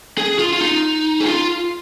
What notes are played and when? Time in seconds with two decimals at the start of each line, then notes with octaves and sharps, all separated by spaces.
0.18 G#4
0.39 F4
0.53 F4
0.61 D#4
1.20 G#4
1.25 F4